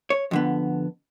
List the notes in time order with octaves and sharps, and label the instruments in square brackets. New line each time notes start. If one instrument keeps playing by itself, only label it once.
[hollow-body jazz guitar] C#5
F2 D3 B3